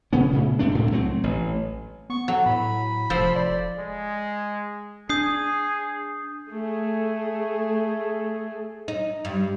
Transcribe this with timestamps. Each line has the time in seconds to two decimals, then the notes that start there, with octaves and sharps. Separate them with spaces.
0.13 C#3 B3 C#4
0.33 A#2 C#3 A3
0.59 G2 A3 C4 D4
0.75 D2 A2
0.91 C#2 F#3 A3 C4
1.24 A1
2.10 B3 C#6
2.28 F#3 A4
2.46 A2 B5
3.10 F1 F3 A4 C5
3.35 D5
3.78 G#3
5.09 D4 G#4 D#6 G6 C7
6.48 A3 G#4
8.88 D#4
9.25 G2